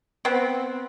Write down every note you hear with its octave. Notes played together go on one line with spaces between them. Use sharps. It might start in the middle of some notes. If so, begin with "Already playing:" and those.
B3 C4